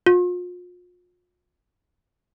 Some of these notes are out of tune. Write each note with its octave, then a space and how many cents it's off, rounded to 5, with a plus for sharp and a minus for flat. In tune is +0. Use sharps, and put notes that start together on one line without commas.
F4 +40